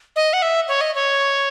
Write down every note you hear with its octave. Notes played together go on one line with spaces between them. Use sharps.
D#5
F#5
E5
C#5
D#5
C#5